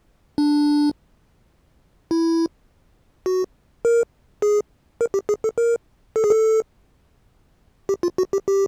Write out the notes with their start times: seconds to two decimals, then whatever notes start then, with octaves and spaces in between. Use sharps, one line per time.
0.38 D4
2.11 E4
3.26 F#4
3.85 A#4
4.42 G#4
5.01 A#4
5.14 G4
5.29 G#4
5.44 A4
5.58 A#4
6.16 A4
6.24 G#4
6.30 A4
7.89 G4
8.03 F4
8.18 F#4
8.33 G4
8.48 G4